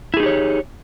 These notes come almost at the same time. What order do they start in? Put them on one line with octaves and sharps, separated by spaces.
E4 G#4 D#4 G4 C#5